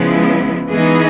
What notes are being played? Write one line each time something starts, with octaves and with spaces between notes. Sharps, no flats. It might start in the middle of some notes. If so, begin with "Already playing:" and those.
Already playing: C#3 F3 G#3 B3 E4
E3 G#3 B3 D#4 G#4